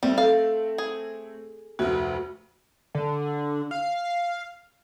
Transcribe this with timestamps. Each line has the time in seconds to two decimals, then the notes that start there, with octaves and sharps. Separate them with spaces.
0.03 G3 A3 C4
0.18 A4 F5
0.78 G#4
1.79 F1 D2 F#4
2.95 D3
3.71 F5